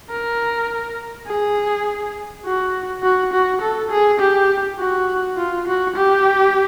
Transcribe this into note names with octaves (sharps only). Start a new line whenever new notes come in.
A#4
G#4
F#4
F#4
F#4
A4
G#4
G4
F#4
F4
F#4
G4